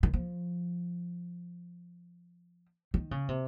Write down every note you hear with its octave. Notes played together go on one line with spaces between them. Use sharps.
D#3
F3
D#3
C#3
C3